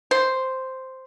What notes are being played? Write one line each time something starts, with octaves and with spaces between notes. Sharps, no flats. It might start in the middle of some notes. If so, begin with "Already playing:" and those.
C5